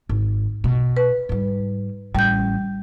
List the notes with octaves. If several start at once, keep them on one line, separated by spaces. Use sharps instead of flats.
G#1
B2
B4
G#2 G3
A1 G3 C#4 G6